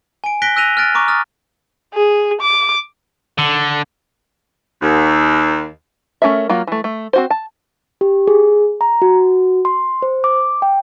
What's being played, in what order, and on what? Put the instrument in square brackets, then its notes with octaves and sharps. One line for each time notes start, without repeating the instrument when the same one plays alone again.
[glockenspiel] G#5 D7
F#6 A#6 B6 D7 G7
E6 F#6 A#6 D#7 F7
F6 F#6 A6 D7
A#5 C#6 D6
D#6 F6 A6
[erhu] G#4
D6
[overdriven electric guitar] D3
[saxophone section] D#2
[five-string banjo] A3 C#4 G#4 A#4 E5
F#3 A#3 F4
E3 A3
A3
C4 F#4 C5
A5
[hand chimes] G4
G#4
A#5
F#4
C6
C5
D6
G5